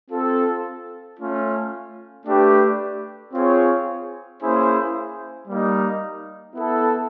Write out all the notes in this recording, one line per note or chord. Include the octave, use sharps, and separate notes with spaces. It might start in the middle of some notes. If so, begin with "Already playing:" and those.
C4 F4 A4
A3 C#4 F4
A3 D4 G4 B4
C4 F4 G#4 C#5
A#3 C#4 E4 G#4 C5
G3 A#3 D#4
B3 E4 A4